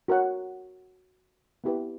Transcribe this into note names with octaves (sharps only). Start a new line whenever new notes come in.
F#4 A#4 C#5 F#5
B3 E4 G4 B4